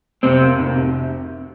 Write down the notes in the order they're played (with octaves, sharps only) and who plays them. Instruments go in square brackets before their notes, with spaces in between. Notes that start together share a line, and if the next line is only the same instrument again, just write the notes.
[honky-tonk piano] F2 [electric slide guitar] C3 C4
[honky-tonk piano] A#3
F1
C3